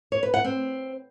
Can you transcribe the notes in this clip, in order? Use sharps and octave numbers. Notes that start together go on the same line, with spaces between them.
C#5
B4
F#5
C4